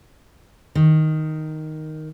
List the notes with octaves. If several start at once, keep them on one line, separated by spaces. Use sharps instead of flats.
D#3